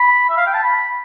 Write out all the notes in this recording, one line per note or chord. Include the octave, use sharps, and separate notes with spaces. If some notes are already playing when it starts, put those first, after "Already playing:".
Already playing: B5
E5
F5
G5
A5
B5